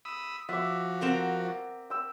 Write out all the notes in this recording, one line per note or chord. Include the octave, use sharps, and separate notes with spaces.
B5 D#6 E6
F3 F#4 E5 D6
C4 A#4 F#5
G5 E6